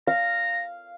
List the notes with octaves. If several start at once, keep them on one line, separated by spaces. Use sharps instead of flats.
F5 A#5